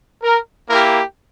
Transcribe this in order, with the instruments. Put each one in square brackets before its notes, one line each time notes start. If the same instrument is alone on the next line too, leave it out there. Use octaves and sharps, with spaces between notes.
[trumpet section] A#4
A#3 E4 G4 A#4